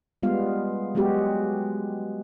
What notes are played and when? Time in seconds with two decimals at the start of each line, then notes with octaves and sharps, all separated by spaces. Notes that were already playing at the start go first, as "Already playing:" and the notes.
0.23 G3 G#3 B3 F4 F5
0.95 F#3 G#3 B3 F#4 G4